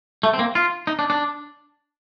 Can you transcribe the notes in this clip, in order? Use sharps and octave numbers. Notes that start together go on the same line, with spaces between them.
A3
C4
A#3
F4
D#4
D4
D4